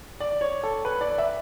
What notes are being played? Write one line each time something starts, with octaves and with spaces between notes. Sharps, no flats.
D5
C#5
A4
B4
D5
E5